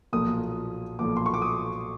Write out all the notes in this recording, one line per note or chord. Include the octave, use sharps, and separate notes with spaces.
B1 A#2 F3 A#3 D#6
B1 A#2 F3 A#3 D6
C6
C#6
D6
D#6